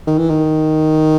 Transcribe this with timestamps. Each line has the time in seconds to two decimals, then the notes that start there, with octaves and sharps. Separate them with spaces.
0.07 D#3
0.18 E3
0.30 D#3